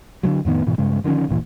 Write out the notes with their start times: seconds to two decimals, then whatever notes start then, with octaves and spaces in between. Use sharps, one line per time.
0.23 D3 F3 F#3
0.45 F2 A2 D#3 B3
0.66 G#2 B2 E3
0.78 G2 C#3 G#3
1.04 D3 D#3 F3 C#4
1.28 D1 G1 A#2 E3